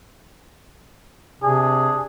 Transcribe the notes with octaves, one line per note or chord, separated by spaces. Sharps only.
C3 D4 G#4